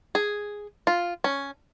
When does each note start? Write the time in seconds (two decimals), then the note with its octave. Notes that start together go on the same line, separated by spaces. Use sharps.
0.15 G#4
0.87 F4
1.24 C#4